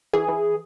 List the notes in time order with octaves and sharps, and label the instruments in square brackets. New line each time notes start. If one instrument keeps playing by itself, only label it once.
[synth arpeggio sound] E3 G#4
E3